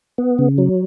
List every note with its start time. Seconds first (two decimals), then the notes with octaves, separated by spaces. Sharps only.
0.18 B3
0.39 C#3
0.58 F#3